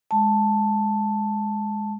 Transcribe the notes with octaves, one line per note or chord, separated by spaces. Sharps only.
G#3 A5